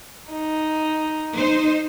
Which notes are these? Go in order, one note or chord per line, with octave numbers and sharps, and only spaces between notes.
D#4
D#4 C5